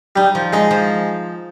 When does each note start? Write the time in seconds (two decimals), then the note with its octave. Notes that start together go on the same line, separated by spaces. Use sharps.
0.16 G3 D#4
0.35 F3
0.53 G#3 D#4
0.71 F3